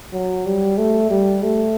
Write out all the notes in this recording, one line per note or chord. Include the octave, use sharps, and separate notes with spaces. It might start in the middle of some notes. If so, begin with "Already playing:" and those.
F#3
G3
A3
G3
A3